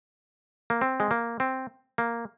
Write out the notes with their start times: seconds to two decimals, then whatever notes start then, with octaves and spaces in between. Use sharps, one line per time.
0.70 A#3
0.81 C4
1.00 G#3
1.11 A#3
1.40 C4
1.98 A#3